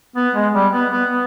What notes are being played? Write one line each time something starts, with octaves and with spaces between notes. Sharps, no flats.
B3
G#3
G3
B3
B3
B3